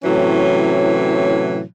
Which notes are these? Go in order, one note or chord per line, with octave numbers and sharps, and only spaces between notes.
A2 C3 E3 F#3 C#4